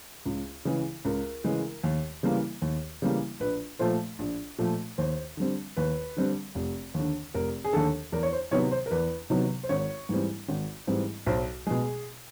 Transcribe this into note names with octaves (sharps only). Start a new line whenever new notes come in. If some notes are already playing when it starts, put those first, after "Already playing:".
C#2
C#3 E3 G#3
C#2 A#4
C#3 E3 G#3
D#2
C#3 E3 G3 A#3
D#2
C#3 E3 G3 A#3
A#1 B4
A#2 F3 A3 C5
A#1
A#2 F3 A3
D#2 C5
D3 G3 C4
D#2 B4
D3 G3 C4
F1
D#2 D3
F1 A#4
G#4
D#2 D3 A4
E2 A#4
C#5
C5
C3 D#3 F#3 B3 C#5
C5
A#4
E2 B4
C3 D#3 F#3 B3
C5
G#1 C#5
G#2 E3 G3 C4
G#1
G#2 E3 G3 C4
B1 C5
B2 G#3 G#4